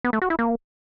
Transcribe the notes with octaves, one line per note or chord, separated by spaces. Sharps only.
B3
A3
F#4
E4
A#3